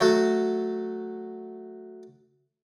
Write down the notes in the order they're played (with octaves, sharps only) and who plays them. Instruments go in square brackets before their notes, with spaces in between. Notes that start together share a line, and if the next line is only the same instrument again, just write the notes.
[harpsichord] F#3 A3 F#4